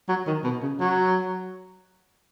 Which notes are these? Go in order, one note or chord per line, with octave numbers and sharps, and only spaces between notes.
F#3
D#3
B2
C#3
F#3